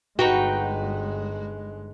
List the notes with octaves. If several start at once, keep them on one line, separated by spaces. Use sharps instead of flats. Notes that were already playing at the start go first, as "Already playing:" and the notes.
G1 G#3 D#4 F#4 B4 G5